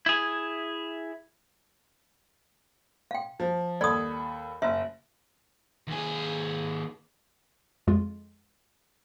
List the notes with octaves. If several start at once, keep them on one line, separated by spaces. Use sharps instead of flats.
E4 G#4
F5 G5
F3
D#2 A4 D5 B5 D#6
F#1 E5
D#2 G#4
F2 G#3 F4